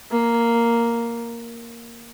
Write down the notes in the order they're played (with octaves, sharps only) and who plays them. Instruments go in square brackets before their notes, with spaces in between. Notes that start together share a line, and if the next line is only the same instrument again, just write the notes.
[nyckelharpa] A#3